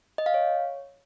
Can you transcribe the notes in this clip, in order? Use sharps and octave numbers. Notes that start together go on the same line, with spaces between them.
D#5
F5
C#5